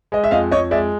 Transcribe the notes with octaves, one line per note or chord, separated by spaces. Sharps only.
G#3 D#5
E5
F2 D#5 F5
F2 C#5 D#5
G#3 D5 E5